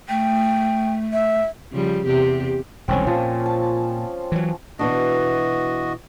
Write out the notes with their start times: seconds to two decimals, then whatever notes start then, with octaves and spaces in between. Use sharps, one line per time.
0.09 A3 G5
1.13 E5
1.72 C#3 F3 G3
2.05 E2 C3 G4
2.88 E1 C2 D#3 C4 C#4
3.07 A#2 F3
3.46 A5
4.32 E3 F#3
4.79 B2 E3 D4 F#4 D#5